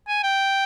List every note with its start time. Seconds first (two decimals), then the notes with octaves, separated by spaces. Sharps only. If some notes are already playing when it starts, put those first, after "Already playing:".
0.08 G#5
0.24 G5